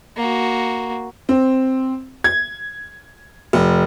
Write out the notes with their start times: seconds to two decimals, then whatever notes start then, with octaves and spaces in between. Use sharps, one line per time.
0.17 A#3 F#4
1.29 C4
2.24 G#6
3.53 F1